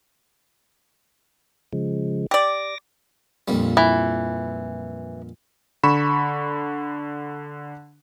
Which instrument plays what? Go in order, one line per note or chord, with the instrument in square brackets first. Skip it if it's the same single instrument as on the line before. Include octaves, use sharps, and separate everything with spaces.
[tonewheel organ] C#3 F3 G#3
[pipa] G4 D5 [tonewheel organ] D6 A#6
[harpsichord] A#1 F2 G3
[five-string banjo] E3
[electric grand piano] D3 B5 C#6 E7